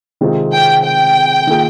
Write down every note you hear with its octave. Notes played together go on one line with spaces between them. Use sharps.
C3 D#3 G#3 C4 F4
G5
G5
D#3 A#3 F4 G#4